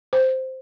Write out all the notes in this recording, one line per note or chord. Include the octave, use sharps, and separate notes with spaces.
C5